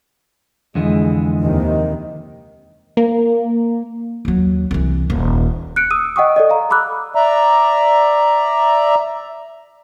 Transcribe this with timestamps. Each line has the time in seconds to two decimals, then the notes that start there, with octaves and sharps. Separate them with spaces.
0.75 F2 D3 E3 G#3
1.40 D#2 C3 D#3
2.97 A#3
4.25 D#2 F#3
4.71 C2 E3
5.10 D#1
5.76 F#6 C#7 D7
5.91 D#6 E6 D#7
6.16 D#5 F#5 G5 C#6 D#6
6.36 A4 D5 D#5
6.50 F5 A#5
6.70 A#5 B5 D6 E6 F#6
7.15 D5 E5 A#5